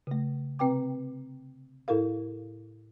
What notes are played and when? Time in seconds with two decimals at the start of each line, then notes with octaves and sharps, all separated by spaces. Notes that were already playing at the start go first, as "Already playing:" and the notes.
0.07 C#3 A3
0.59 C3 C4 B4 G5 D6
1.88 A2 E4 A4 A#4 F5